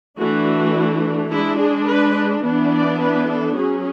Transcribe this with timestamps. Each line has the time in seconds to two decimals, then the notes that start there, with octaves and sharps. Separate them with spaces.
0.18 E3 A3 D4 F#4
1.30 G#3 D4 E4
1.58 G#4
1.86 B4
2.42 E3 B3 D4
2.71 D5
2.98 B4
3.27 A4
3.54 F#3 C#4 G#4